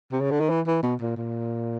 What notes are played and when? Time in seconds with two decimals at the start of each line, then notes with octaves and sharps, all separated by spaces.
0.12 C3
0.21 C#3
0.31 D3
0.40 D#3
0.49 E3
0.67 E3
0.83 B2
1.01 A#2
1.17 A#2